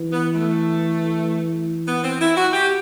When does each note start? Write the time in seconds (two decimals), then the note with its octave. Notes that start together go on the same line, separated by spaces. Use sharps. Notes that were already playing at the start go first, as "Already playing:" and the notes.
Already playing: E3
0.13 B3
0.34 A3
1.87 B3
2.04 C4
2.21 E4
2.36 F#4
2.53 G4